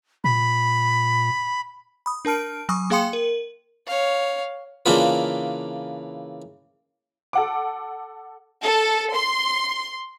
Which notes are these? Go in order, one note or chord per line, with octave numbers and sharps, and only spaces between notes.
A#2 B5
B5 D#6
D4 A#4 A5 F6 D7
F#3 G#5 C#6 D#6
A#3 G#4 F5 G5 C6 C#7
A#4
C#5 F5
C#3 E3 A#3 D4 F4 B4
A4 F#5 D6
A4
C6